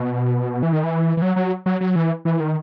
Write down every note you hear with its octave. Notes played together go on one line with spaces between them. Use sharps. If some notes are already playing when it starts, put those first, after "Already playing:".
Already playing: B2
E3
D#3
E3
E3
F#3
F#3
F#3
F#3
E3
E3
D#3